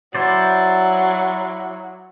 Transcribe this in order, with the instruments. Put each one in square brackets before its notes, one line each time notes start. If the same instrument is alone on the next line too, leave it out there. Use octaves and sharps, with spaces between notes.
[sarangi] F#3 [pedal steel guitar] E4 C5 D5